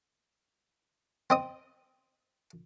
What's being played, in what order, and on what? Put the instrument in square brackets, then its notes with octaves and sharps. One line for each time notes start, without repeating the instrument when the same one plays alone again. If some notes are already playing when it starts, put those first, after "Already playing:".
[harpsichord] C4 D#5 D#6